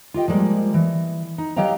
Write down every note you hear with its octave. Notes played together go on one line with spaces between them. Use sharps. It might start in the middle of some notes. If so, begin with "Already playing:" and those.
F4 G4 D#5 G5
F3 G3 G#3 A#3
E3
D#4
F#3 G4 D#5 F5 G5 A#5